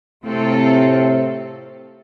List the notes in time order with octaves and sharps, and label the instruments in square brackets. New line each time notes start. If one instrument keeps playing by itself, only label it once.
[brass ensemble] A2 C3 [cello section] A3 C4 F4 A4